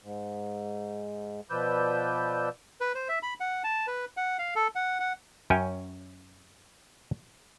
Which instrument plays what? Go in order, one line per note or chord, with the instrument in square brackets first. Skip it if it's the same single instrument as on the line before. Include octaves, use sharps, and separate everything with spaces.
[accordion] G#2
B2 F3 B4 D5 E6 G6
[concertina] B4
C5
E5
B5
F#5
A5
B4
F#5
F5
A4
F#5
F#5
[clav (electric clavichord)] F#2 C#4 C#5 G5 G#5